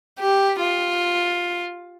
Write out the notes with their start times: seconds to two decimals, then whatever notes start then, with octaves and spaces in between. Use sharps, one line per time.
0.20 G4
0.58 F4